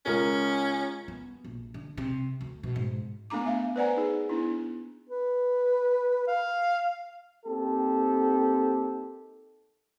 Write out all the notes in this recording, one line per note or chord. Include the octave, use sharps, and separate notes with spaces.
C#2 C#4 A#4
B3
A#1
D3
C3
D2
B2
G#2
A3 B3 D4 A#5 D6
B3 E5 F5
B4 C5 D5 F#5 G#5 A#5
D#4 G#4
B3 D4 E4
B4
F5
A#3 C4 D#4 G4 A4